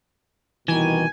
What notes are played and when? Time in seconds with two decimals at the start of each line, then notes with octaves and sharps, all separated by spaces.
0.68 C2 B2 D#3 E3 G#5